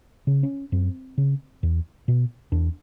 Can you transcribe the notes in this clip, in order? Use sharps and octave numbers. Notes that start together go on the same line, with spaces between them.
C#3
C#4
F#2 C4
C#3
E2
B2
E2 D4